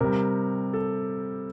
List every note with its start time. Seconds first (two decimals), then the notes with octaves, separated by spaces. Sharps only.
0.01 C3 G3 A#4
0.73 A4